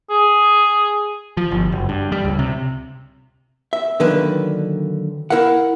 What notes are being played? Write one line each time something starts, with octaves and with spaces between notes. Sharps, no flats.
G#4
F3
G1
F#1
G2
G3
C#2
C3
E5
D3 D#3 F#3 A#3 D4 B4
E4 A#4 F5 F#5